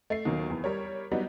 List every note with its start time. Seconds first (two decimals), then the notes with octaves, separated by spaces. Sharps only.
0.10 A3 C7
0.25 D#2 B2 D#3 F#3 A#3
0.50 E2
0.64 G3 A#4 C#5
1.11 F#3 G3 B3 D#4